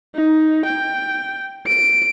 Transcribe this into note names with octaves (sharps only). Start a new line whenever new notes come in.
D#4
G5
D7